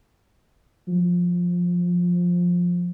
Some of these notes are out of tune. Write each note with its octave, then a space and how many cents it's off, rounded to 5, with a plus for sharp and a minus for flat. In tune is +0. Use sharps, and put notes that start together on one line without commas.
F3 +10